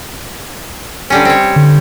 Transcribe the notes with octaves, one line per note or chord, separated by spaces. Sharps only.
D3 G3 C#4
C4 C#5
D3